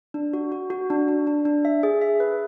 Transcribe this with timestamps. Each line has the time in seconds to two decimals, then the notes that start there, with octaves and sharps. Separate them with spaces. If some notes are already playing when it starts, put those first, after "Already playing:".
0.14 D4
0.33 F#4
0.52 F#4
0.70 F#4
0.90 D4
1.08 D4
1.27 D4
1.45 D4
1.65 E5
1.83 G#4
2.01 E5
2.20 B4